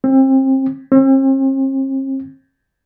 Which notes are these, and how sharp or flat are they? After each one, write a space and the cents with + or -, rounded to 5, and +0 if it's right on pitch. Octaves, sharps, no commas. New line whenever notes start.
C4 +30
C4 +45